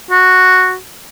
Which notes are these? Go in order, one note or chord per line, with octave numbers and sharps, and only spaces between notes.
F#4